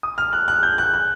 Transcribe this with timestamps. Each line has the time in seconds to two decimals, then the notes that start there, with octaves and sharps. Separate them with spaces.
0.03 D#6
0.18 F6
0.33 F#6
0.48 F#6
0.63 G6
0.78 F#6
0.94 F#6